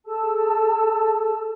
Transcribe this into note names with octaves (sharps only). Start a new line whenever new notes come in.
G#4 A4 A5 E6